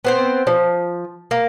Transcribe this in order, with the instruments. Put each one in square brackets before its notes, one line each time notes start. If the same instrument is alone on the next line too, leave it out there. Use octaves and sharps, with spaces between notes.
[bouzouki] B3 C4 C5
F3
A#3